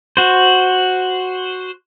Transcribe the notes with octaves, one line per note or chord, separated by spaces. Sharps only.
F#4 C5